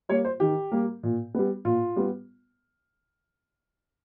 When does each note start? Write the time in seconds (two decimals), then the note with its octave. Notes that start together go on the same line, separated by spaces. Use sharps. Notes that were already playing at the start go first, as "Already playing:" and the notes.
0.09 G3 A#3 C#5
0.25 C5
0.40 D#3 G4
0.72 G3 A#3
1.03 A#2
1.35 G3 B3
1.65 A#2 F4
1.96 G3 B3